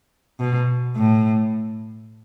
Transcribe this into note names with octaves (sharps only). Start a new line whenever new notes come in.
B2
A2